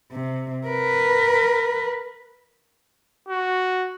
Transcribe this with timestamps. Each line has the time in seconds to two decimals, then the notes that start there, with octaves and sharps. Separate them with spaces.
0.12 C3
0.67 A#4 B4
3.29 F#4